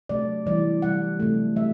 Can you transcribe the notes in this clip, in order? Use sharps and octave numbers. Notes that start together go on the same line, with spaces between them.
C3 F#3 A3 D5
C3 E3 G3 D5
C3 G3 F#5
C3 F#3 A3
B2 F#3 A3 E5